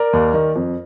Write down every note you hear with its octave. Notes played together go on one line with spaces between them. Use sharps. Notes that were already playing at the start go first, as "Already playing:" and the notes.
Already playing: A#4 D5
D#2
D#3
F2